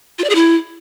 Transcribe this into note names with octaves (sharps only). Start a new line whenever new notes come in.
F4
D5
G#4
E4